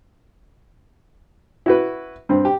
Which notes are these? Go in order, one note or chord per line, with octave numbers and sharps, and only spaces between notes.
E4 F#4 B4
G2 C4
G4